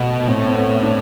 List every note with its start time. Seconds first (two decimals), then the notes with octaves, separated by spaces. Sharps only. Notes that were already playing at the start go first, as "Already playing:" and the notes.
Already playing: B2 A3 B3
0.20 B3
0.28 A2 C4
0.47 C4
0.55 B3
0.83 D4